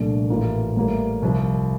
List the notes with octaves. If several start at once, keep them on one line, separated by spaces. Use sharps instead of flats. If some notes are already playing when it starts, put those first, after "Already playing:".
Already playing: C2 A#2 F3 A3 D4
A1 A2 E3 A#3 F4
A1 A2 G3 A#3
C2 C3 F3